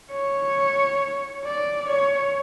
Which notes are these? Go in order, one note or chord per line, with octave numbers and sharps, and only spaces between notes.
C#5
D5
C#5